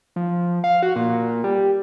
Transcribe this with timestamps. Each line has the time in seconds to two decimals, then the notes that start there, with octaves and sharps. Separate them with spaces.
0.16 F3
0.64 F5
0.83 F#4
0.96 A#2
1.44 G3